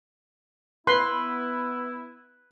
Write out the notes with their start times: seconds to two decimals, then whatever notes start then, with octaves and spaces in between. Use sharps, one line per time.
0.87 B3 E4 B4 C6